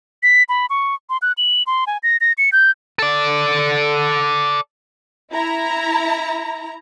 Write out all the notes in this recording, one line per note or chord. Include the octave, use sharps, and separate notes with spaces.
B6
B5
C#6
C6
F#6
F#7
C6
G#5
A#6
A#6
C#7
G6
A4 D5
E4 A#5